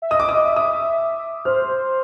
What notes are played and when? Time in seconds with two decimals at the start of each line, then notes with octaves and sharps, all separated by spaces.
0.02 E5
0.11 D#5 D#6
0.20 E5 D6
0.29 D#6
0.33 D#5
0.44 E5
0.56 E5 D#6
1.45 C5 F6